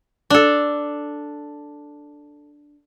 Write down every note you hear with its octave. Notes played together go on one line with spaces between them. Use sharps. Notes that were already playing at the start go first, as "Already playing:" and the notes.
D4 A4